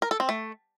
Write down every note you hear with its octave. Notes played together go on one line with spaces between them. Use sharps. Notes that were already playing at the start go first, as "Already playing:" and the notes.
A#4
A4
C4
A3